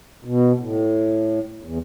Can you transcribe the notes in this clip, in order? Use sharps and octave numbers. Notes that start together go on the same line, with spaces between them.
B2
A2
E2